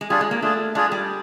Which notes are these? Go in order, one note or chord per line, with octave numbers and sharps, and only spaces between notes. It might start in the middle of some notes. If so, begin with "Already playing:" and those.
G#3
G3 D4 F4 G#4
G#3
A#3
A3 D4 F4 G#4
G#3 D4 F4 G#4
G3